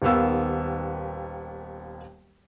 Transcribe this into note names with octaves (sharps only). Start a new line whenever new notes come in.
D#1 D#2 D#3 B3 F5 E6